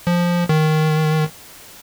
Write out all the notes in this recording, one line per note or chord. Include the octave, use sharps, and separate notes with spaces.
F3
D#3